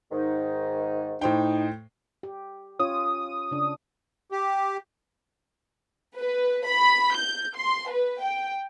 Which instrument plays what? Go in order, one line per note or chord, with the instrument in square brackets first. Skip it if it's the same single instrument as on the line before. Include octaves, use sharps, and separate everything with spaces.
[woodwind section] G#2 D#3 D#4
[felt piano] A2 C5 G5 [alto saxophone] D#4
[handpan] G4
[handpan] C#4 F4 C#5 [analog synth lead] D#6
[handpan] C#3 D4
[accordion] G4
[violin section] B4
B5
G6
C6
B4
G5